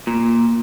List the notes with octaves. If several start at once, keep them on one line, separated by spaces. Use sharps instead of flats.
A#2